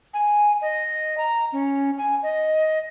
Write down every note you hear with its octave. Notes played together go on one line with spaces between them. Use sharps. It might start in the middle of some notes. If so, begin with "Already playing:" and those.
G#5
D#5
A#5
C#4
G#5
D#5